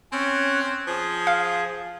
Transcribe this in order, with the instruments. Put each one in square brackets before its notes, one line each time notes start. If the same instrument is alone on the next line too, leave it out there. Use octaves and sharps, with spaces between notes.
[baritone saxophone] C4 [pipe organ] C#4 C#5 F#6
[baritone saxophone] F3 [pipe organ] G#4
[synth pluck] F5